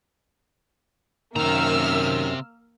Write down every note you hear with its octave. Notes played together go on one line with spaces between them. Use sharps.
F#2 C3 D#3 A#3 A#5 E6 F6